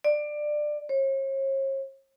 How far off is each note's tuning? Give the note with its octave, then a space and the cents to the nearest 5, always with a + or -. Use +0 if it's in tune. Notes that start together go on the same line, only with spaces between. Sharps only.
D5 +20
C#5 -45